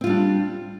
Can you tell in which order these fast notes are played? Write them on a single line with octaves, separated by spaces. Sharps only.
C4 F4 G3 D4